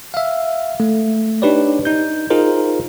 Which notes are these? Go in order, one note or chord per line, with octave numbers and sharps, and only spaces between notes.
E5 F5
A3
D4 D#4 G4 B4 C#5 D5
D#4 G6
D#4 F4 G#4 A#4 C5